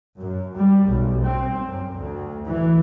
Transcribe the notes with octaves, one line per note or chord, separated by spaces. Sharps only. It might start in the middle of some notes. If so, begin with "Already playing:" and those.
F#2
G3
B1
C4
F#2
D2
E3